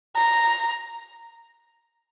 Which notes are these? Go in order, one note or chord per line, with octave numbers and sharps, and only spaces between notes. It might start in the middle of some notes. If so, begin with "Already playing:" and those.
A#5